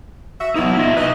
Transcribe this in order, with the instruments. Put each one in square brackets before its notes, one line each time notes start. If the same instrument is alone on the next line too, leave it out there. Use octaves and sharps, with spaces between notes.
[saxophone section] F#4 E5
[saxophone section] E3 E4 [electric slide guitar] B3 D#4
[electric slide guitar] F4 D#5 E5
[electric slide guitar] D#4 B4 [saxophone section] D#5